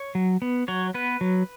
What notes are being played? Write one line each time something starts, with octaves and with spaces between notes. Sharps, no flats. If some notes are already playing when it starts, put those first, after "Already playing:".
Already playing: C#5
F#3
B3
F#3 C#5
B3 B4
F#3